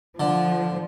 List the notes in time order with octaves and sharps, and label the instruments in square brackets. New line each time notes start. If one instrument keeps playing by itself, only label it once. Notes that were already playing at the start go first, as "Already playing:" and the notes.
[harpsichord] D3 [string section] F3